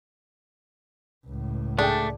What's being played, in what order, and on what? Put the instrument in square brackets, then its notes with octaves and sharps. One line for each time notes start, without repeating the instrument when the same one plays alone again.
[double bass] C#2 A2
[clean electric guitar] A3 [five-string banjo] D4 [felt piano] G#4 G5